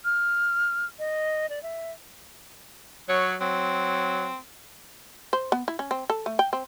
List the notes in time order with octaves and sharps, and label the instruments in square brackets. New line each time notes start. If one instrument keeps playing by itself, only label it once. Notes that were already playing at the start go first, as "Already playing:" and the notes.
[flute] F6
D#5
D5
E5
[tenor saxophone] F#3 [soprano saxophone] C#5
[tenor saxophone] F#3 [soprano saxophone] C4
[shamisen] C5
B3
E4
C#4
C4
A4
A3
G5
C4